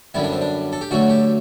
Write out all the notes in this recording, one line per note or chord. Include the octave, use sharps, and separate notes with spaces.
F#2 D3 G3 B3 E4
D4
C4
D4
A4
G4
D2 D3 F#3 A3 F#4
G4